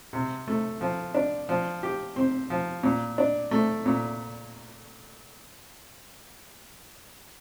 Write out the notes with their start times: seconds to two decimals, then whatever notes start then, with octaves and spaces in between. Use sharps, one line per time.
0.13 C3
0.48 A3
0.81 F3
1.14 D4
1.49 F3
1.83 G4
2.16 C4
2.50 F3
2.83 A#2
3.18 D4
3.51 A3
3.86 A#2